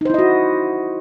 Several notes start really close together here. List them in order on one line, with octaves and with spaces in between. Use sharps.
D#4 C5 E4 D#5 F#4